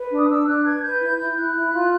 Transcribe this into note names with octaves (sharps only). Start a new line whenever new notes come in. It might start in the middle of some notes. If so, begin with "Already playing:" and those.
Already playing: B4
D4
D#6
D4 E6
D4 F#6
B4 G#6
B4 G6
E4 G6
E4
G6
E4 F#6
E4
F4